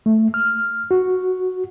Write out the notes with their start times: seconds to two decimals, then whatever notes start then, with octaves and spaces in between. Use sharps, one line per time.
0.06 A3
0.34 F6
0.91 F#4